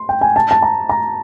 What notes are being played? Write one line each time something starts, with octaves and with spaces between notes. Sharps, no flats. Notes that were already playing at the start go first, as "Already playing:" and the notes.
Already playing: C6
G5
G#5
A5
A5
A#5
A#5